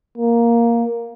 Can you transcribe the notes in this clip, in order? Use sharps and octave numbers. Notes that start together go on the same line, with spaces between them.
A#3